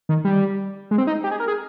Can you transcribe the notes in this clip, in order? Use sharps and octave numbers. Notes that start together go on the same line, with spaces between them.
D#3
G3
G#3
C4
D#4
G4
G#4
A#4
G#4